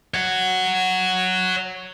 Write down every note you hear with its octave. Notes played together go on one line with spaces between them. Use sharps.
C#5 F#5